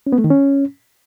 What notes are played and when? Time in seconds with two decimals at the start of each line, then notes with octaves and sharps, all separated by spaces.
0.07 C#4
0.12 B3
0.18 A3
0.24 D#3
0.30 C#4